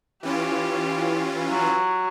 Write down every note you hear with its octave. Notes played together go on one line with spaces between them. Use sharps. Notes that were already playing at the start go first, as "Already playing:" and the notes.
E3 C#4 F4 G4
F#3